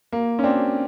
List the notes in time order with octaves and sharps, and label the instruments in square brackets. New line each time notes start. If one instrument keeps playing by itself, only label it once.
[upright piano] A#3
C#4
C4 D4